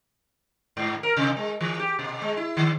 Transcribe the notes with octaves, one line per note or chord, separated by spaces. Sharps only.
G#2
A#4
C3
G#3
E3
G4
B2
G#3
E4
D#3